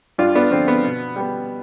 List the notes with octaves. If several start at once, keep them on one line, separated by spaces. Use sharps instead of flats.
G2 D4 F4
B3 D4
D3 F3 B3 C4
B3
B2
G3 B3